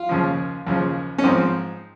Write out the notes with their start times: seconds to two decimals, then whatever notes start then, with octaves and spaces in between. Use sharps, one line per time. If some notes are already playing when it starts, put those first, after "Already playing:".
Already playing: F4
0.09 D#2 C#3 F3
0.67 D#2 C#3 F3
1.18 C#4
1.24 G#2 F3 C4